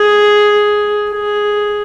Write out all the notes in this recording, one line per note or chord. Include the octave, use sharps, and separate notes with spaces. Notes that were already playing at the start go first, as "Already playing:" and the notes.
Already playing: G#4
G#4